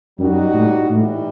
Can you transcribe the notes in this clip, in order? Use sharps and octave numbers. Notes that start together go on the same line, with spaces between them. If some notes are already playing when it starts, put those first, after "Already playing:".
F#2 G3 D#4 F#4
A2
A2 E3 G3 D#4 F#4